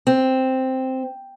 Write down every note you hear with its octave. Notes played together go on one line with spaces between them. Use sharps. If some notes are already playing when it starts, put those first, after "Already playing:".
C4